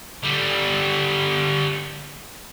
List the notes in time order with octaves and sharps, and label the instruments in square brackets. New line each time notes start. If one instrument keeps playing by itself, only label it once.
[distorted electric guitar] D3 G3